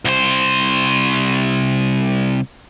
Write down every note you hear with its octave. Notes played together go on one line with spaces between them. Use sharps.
C2 C5